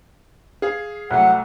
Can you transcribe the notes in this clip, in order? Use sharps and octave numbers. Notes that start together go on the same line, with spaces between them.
G#4 F5
C2 F#3 A3 F#5